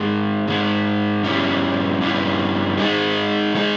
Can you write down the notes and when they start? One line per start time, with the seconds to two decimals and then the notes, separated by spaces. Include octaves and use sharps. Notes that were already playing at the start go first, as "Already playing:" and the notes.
Already playing: G#2 D#3 G#3
0.48 G#2 D#3 G#3
1.24 G2 G3 C#4 E4
2.01 G2 G3 C#4 E4
2.78 D#3 G#3 D#4 G#4
3.54 D#3 G#3 D#4 G#4